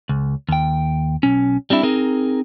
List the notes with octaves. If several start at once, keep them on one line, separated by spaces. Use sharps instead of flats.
C#2
D#2 G5
B1 C#4
G3 C4 D4 E4
C4 D#4 G#4 A#4